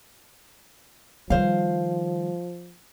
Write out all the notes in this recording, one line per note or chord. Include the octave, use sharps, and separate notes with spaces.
D#3 F3 G3 C5 F5